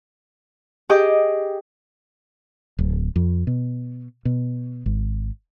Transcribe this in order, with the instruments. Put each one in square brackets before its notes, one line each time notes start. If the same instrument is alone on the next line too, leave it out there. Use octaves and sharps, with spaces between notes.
[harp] G4 G#4 D#5 D6 G6
[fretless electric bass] D1
F2
B2
B2
G#1